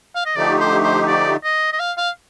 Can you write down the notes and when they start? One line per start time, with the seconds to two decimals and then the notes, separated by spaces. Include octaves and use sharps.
0.16 F5
0.26 D#5
0.36 D3 F3 A3 D#4 G4 D5
0.60 C5
0.84 C5
1.07 D5
1.44 D#5
1.73 D#5
1.80 F5
1.97 F5